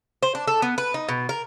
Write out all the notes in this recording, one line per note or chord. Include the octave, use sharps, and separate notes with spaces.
C5
D4
A4
B3
B4
D#4
B2
A#4